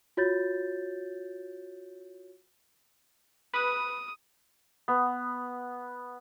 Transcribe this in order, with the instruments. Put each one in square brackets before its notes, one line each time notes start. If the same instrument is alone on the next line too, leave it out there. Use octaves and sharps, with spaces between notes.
[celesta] F4 F#4 C#5 G6 A6
[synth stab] B4 [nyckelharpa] D#6
[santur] B3